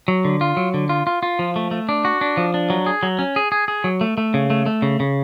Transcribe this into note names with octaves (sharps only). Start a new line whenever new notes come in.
F#3
D3
F4
F#3
D3
F4
F4
F4
F3
A3
A3
D4
F#4
D4
F3
D4
F#3
G#4
F#3
C#4
G#4
G#4
G#4
F#3
A3
A3
C#3
A3
A3
C#3
C#3